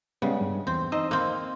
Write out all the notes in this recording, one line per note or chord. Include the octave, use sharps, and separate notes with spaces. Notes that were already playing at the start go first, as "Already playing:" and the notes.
C#3 G3 G#3 B3
G2
E2 C4
D#4 C5 D#5 E6
A#3 C4